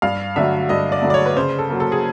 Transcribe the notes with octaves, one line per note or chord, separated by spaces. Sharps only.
G2 F5
D3 F#3 A3 E5
G2 D#5
D5
D3 F#3 A3
D5
C#5
B4
C#3 C5
A4
F#3 A#3
A4
G#4